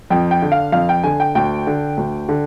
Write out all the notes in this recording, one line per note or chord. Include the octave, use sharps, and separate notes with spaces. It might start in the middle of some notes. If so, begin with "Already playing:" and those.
F2 G5
G5
D3
F5
F2 F5
G5
D3 G#5
G5
D2 G5
D3
D2
D3